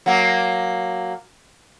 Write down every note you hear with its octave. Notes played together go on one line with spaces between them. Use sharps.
F#3 A#3